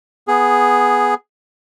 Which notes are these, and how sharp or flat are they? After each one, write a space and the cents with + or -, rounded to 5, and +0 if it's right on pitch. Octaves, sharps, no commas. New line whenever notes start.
B3 +0 G#4 +0